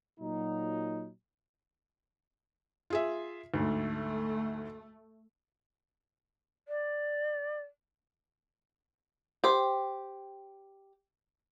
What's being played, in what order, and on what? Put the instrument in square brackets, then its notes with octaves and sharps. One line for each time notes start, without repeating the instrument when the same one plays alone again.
[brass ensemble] A#2 F#3 D#4
[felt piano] F4 G#4 E5
[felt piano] D2 G#2 [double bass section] A3
[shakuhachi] D5
[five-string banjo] G4 C5